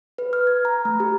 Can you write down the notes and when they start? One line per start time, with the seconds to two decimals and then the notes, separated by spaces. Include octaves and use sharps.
0.18 B4
0.33 F6
0.47 G#6
0.65 A#5
0.85 A3
1.00 G4